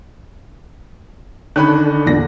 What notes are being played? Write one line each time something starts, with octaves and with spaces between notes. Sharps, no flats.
D3 D#3 C#4 D4 B5 F#6
E2 A#2 D3 D5 A#6